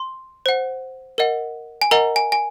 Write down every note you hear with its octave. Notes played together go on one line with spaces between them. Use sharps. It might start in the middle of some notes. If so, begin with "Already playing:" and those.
Already playing: C6
C5 F#5
A#4 D#5 F#5
G#5
A#4 D#5 F#5 A#5
G#5
G#5